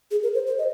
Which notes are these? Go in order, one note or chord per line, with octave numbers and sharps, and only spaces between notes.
G#4
A#4
C5
C5
D#5